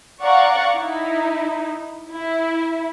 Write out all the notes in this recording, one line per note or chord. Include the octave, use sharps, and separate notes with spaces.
D5 F5 F#5 A#5 C#6
D#4 E4
E4